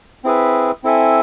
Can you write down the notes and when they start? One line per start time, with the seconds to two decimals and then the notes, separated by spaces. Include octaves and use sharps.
0.24 C4 E4 G#4 B4 E5
0.83 C4 E4 A4 E5 G#5